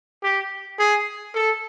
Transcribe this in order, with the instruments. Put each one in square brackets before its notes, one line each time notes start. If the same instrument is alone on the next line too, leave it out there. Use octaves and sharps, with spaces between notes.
[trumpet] G4
G#4
A4